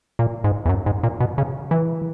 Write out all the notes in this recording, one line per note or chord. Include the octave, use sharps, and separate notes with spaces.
A#2
G#2
E2
F#2
G#2
A#2
B2
C#3
E3